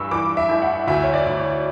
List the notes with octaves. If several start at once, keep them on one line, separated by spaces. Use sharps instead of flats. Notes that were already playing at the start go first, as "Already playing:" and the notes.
Already playing: G2 E3 C#6 E6
E3 D6
E5
A1
F#5
D2 E5
C#5
D5
D2
C#5